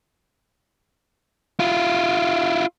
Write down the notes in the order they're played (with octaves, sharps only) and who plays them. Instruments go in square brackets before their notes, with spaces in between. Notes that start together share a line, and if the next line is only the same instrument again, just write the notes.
[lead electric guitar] E4 F4